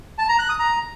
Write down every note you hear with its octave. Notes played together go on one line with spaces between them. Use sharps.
A5
A#5
F#6
D#6
A#5